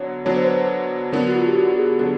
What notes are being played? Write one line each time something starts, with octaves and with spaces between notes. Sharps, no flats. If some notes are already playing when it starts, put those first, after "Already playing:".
Already playing: D3 F#3 B3 C#5
D3 F#3 B3 D4 C#5
C5
B4
C5
D3 F#3 B3 D4 A#4
F#4
F4
G4
F#4
G#4
D3 F#3 B3 D4 A4